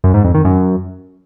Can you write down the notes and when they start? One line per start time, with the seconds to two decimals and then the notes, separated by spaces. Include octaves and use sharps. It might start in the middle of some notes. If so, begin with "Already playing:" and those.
0.04 F#2
0.14 G#2
0.24 F2
0.34 D#3
0.45 F#2